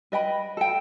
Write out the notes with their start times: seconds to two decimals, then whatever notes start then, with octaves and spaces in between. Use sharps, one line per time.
0.12 B4 D#5 G5 B5
0.57 A4 G5